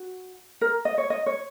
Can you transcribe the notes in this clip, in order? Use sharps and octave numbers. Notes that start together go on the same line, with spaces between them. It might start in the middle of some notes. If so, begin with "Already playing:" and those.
Already playing: F#4
A#4
D#5
C#5
D#5
C#5